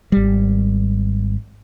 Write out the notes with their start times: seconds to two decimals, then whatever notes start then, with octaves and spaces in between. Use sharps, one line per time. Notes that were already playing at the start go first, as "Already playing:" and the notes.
0.12 G#1 G3